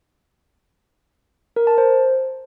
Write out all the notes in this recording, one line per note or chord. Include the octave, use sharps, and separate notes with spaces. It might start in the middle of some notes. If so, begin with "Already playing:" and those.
A#4
A5
C5